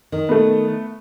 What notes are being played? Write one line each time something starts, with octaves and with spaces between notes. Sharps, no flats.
D#3
A3 B3